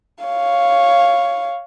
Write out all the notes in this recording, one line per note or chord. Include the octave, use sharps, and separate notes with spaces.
C#5 F5